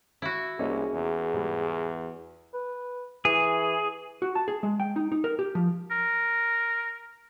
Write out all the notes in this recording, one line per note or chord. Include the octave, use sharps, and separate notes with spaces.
E4 F#4
C2 A#3 C#4 D#4 G#4
E2
G#2 G3
B4
E3 G#4
F#4
A5
G#4
G#3
G5
D#4
D#4
A#4
G4
F3
A#4